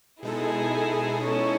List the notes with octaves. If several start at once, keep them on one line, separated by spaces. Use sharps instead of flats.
B2 G#3 D#4 E4 G#4 A4
C#4 E4